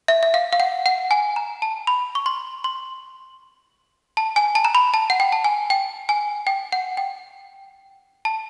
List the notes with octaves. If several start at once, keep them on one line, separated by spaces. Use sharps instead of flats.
E5
E5
F5
F5
F#5
F#5
G#5
A#5
A5
B5
C#6
C6
C6
A5
G#5
A5
A#5
B5
A5
F#5
G5
A5
G#5
G5
G#5
G5
F#5
G5
A5